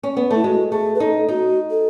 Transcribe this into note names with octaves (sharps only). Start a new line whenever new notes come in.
C#4
B3
A3 E4
G#3 F#4
A3 G#4
B4
D#4 A4
D#4 F#4
A4